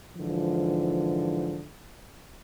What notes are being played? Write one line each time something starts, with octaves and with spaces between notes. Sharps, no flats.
G#2 D3 E3 F3